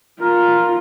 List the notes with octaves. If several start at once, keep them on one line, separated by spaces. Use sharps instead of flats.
F4 A#4